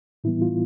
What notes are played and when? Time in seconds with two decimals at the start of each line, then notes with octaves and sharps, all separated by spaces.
0.24 A2 E3 G3 B3 E4
0.42 F4